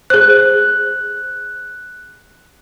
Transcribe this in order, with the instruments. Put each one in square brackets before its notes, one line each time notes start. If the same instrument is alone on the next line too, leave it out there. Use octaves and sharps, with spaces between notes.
[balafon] G#4 C5 [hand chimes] F#6